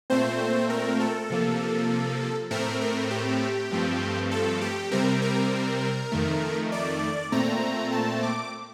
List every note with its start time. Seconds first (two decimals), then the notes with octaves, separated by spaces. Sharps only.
0.10 A#2 A3 C4 C5
0.70 A#4
1.00 A4
1.30 C3 F3 A#3
2.51 A2 A3 C4 A#4
2.81 A#4
3.11 G4
3.71 G2 F3 A3 C4
4.31 A4
4.61 G4
4.91 C3 G3 C4 A#4
5.22 A#4
6.12 F2 D#3 A3
6.72 D5
7.32 A#2 A3 C4 A#5
7.92 A5
8.23 D6